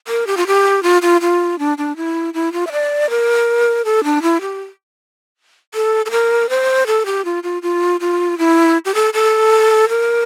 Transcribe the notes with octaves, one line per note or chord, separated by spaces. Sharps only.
A#4
G4
F4
G4
F4
F4
F4
D4
D4
E4
E4
F4
E5
D5
A#4
A4
D4
E4
G4
A4
A4
A#4
C5
A4
G4
F4
F4
F4
F4
E4
G4
A4
A4
A#4